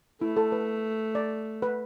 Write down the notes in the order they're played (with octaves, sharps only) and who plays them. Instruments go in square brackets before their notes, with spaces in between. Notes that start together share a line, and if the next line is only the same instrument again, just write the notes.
[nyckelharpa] A3 [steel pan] E4
[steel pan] A4
B4
D5
B4